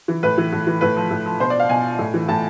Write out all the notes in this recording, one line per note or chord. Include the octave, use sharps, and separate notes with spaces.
E3
A2 B4
E3
A2
E3
A2 B4
F3
A2
F3
B2 C5
D5
F5
B2 G#5
A2
E3
A2 A5